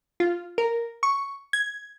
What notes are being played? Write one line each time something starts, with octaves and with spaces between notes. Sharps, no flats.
F4
A#4
C#6
G#6